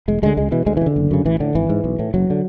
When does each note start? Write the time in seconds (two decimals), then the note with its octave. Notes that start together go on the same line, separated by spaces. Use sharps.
0.08 E1 G#3
0.22 D2 D3 G#3
0.37 C#2 G#3
0.51 B2 E3
0.66 D2 G#3
0.77 E3
0.81 C#3
0.86 D3
0.96 F#1
1.11 F#2 C#3
1.25 A1 E3
1.40 A2 D3
1.55 G#1 E3
1.69 G#2
1.84 B1
1.99 A2
2.14 F#1 F#3
2.30 D3